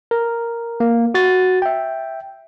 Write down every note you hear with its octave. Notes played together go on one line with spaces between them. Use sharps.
A#4
A#3
F#4 A6
E5 G5